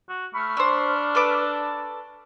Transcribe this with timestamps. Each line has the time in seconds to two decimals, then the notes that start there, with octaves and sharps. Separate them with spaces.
0.09 F#4
0.34 A3 B5 C#6 F6
0.57 D4 C5 E6
1.15 A4 B4 D6